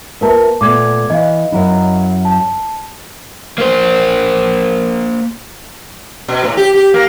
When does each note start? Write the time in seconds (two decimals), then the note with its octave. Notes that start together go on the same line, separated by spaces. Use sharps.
0.21 A#3 F4 A#4 B4 E5 A5
0.61 A#2 A3 B3 D6 G#6
1.10 E3 D#5 F5
1.52 F#2 F#3 E4
2.25 A5
3.58 A#3 C5
6.28 B2
6.44 A2
6.57 G4
6.74 G4
6.94 A#3